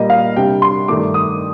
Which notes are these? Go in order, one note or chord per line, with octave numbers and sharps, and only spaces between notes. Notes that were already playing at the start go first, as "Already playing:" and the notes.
Already playing: A#2 G3 A#3 D#5
F5
C3 G3 D4 G5
C6
G2 D#3 A3 D6
D#6